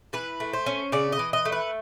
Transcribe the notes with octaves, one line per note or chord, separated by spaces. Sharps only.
E3 B4
A3
C5
C#4
C#3 D5
D#5
E3
D#5
A3
B4